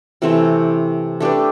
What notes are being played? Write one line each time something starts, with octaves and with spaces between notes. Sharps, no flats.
C3 E3 A3 C4
A3 D4 G4 B4